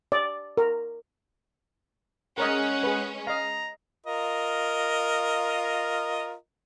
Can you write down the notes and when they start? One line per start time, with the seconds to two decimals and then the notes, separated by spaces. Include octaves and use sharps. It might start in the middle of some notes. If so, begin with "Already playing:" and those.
0.12 D5
0.57 A#4
2.38 G#3 C#4 A#4 C#5 D#5 F#5
2.83 G#4 B4
3.27 D#5 F5 A#5
4.06 F4 A#4 D#5